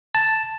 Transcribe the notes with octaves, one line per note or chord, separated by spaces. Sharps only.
A5